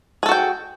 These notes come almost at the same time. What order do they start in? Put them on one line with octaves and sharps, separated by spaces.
G#4 A4 F#4 G5